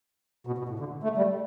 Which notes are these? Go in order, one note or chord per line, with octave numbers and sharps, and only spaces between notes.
B2
B2
A2
D3
A3
G3